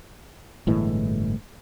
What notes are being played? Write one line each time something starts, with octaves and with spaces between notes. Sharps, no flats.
G1 A2 E3 G#3